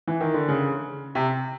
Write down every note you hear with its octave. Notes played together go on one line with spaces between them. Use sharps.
E3
D#3
D3
C#3
C3